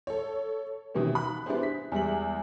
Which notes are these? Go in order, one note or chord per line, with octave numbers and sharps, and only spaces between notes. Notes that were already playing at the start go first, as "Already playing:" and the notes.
A4 C#5
B2 D#3 E3 A#3 C#4
B5 F#6
B3 D4 E4 G4 G#4 C5
B6
E2 G3 G#3 E5 F#7